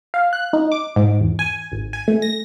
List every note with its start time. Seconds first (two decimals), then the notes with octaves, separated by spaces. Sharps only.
0.14 F5
0.33 F#6
0.53 D#4
0.72 D6
0.96 G#2
1.21 E2
1.39 G#5
1.72 G#1
1.93 G#5
2.08 A3
2.22 A#6